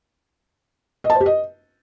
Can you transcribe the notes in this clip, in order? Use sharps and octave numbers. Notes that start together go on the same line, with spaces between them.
D#5
A5
C5
G4
D#5